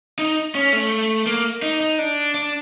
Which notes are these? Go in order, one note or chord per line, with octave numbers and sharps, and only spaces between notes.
D#4
C#4
A3
A#3
D#4
D#4
D4
D4